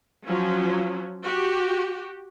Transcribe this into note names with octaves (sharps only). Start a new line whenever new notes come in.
F3 F#3 C#4
F#4 G4